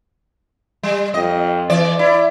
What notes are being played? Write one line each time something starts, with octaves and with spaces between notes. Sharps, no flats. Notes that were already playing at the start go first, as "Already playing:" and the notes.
G3
F2 D#5
E3 D5
E4 D5